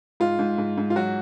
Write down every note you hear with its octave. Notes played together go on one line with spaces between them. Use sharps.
G#2 F4
G#2
G#2
G#2
F4
F#3 F#4